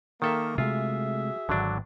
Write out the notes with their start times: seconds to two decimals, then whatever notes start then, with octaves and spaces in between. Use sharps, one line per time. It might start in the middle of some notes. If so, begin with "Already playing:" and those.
0.22 D#3 A#3 A4 E5
0.58 C3 G#3 A3 F4 F#4 G#4 E5
1.49 D#1 G#1 D3 F#3 D4